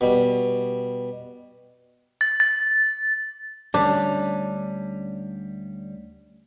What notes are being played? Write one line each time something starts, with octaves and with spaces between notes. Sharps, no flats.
B2 G3
A6
A6
D2 G3 C#4 D4